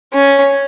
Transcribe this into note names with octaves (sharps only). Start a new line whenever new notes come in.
C#4